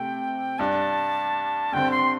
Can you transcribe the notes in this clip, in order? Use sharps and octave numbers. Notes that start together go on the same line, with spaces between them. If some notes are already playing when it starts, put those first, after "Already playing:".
Already playing: C3 A3 C4 G5
G2 G3 D4 A5
G2 D3 C4 G5
C6